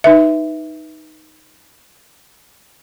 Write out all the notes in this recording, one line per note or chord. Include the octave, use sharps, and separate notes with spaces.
D#4 B4 E5